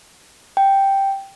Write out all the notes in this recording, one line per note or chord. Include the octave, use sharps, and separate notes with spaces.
G5